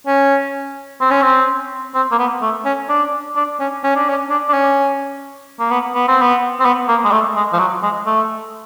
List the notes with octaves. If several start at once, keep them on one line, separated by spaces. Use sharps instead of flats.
C#4
C4
C#4
C4
C4
A#3
B3
A3
C#4
D4
D4
C#4
C#4
D4
C#4
D4
D4
C#4
A#3
B3
B3
C4
B3
C4
B3
A#3
G#3
A3
G#3
F3
F#3
G#3
A3